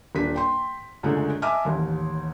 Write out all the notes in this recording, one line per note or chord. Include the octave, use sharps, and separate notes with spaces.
D#1 D4 B6
G5 C6
C#2 F#2 D3 G#3 A3
D#5 E5 G#5 A5 D6 F6
A1 D#2